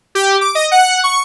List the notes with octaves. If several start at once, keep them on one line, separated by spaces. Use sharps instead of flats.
G4
D6
D#5
F#5
C#6